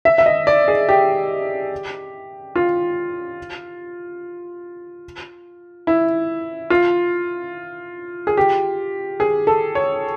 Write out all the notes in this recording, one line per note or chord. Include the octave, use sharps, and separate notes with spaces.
E5
E5
D#5
D5
G#4
G4
F4
E4
F4
G#4
G4
G#4
A4
C#5